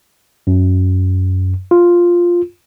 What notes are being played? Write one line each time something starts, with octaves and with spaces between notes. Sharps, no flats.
F#2
F4